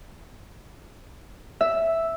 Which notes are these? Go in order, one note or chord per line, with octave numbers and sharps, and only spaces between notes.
E5